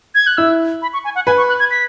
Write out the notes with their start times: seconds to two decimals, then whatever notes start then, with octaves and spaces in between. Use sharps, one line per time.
0.15 G#6
0.27 F#6
0.38 E4 E6
0.82 B5
0.93 C#6
1.04 G#5
1.15 F#5
1.26 B4 G#5
1.37 C#6
1.49 F#6
1.60 G#6
1.71 B6